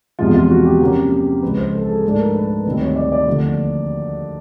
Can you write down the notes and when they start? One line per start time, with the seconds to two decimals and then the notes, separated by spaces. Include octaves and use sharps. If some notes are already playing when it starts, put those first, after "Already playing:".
0.19 E2 C3 F3 G#3 F4
0.34 F4
0.50 F#4
0.65 G4
0.81 C3 F3 A#3 C#4
1.42 C#2 C#3 F3 B4
1.58 C5
1.73 A4
1.84 A4
1.89 G#4
2.04 G#2 F3 A3 D4 A4
2.19 A#4
2.34 B4
2.50 B4
2.65 D2 C3 D#3 G3 C4 B4
2.81 C#5
2.96 D5
3.12 D5
3.27 D#2 D3 F3 A3